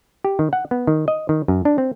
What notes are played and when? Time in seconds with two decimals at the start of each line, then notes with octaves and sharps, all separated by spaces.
0.25 G4
0.39 D#3
0.53 F#5
0.71 B3
0.87 D#3
1.08 D#5
1.29 D#3
1.48 F#2
1.65 D4
1.78 C4